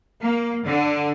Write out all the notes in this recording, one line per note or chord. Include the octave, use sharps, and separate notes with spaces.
A#3
D3